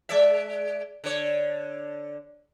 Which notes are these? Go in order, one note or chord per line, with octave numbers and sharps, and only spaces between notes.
G#3 D5 E5
D3 C#5